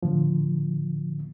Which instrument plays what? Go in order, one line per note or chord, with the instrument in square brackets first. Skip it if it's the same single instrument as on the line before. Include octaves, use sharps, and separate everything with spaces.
[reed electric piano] A2 D3 F3